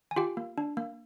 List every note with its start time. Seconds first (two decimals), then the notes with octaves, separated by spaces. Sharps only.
0.11 G#5
0.16 F4 G4 G5
0.37 A#3
0.58 D4
0.77 A#3